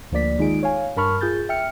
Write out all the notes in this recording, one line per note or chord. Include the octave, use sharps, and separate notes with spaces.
D2 F3 A#3 D5 B6
D#3 G#3 D#4 F4 G#4 D7
C#5 F5 G#5
G2 A#4 A5 B5 C#6 F6
F4 G#4 G6 A6
E5 G5 F6 C#7